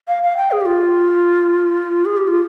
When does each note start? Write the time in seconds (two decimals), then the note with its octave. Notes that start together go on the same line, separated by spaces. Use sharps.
0.08 F5
0.23 F5
0.37 G5
0.51 G#4
0.61 G4
0.66 F4
2.05 G#4
2.17 G4
2.28 F4